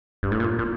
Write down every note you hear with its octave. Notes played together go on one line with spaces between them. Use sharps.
G2
A2
A#2
A#2